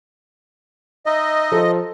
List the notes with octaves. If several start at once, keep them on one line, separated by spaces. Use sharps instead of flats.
D#4 D#5 E5
F3 A4